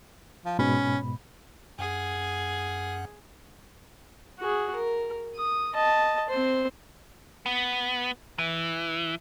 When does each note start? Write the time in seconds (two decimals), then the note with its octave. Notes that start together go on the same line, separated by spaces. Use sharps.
0.45 F3
0.59 G#2 B2 C#4 B5
1.79 F#2 G#4 F#5
4.39 F#4 G#4
4.76 A#4
5.36 D#6
5.75 D#5 A5
6.30 C4 C5
7.46 B3
8.38 E3